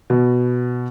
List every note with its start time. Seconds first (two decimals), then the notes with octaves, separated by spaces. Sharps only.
0.10 B2